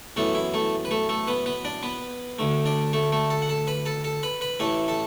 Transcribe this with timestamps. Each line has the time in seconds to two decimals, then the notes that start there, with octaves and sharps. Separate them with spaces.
0.16 F#2 E3 A3 B3 A4
0.35 E4
0.54 A3 A4
0.85 B4
0.91 A3 A4
1.09 A3 A4
1.27 B3 B4
1.46 B3 B4
1.65 D4 D5
1.83 B3 B4
2.39 D2 D3 A3
2.66 D4 D5
2.93 A3 A4
3.12 A3 A4
3.30 A4 A5
3.42 F#5
3.49 A4 A5
3.67 B4 B5
3.86 A4 A5
4.04 A4 A5
4.23 B4 B5
4.41 B4 B5
4.60 A1 A2 E3 A3 A4 A5
4.88 A4 A5